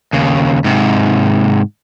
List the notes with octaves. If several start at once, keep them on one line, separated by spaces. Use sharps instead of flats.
D#2 C#3
G#2 C3